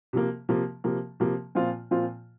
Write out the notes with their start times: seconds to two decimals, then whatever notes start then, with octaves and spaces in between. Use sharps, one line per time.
0.13 C3 F3 A#3
0.49 C3 F3 A#3
0.84 C3 F3 A#3
1.20 C3 F3 A#3
1.55 A#2 F3 C4 F4
1.91 A#2 F3 C4 F4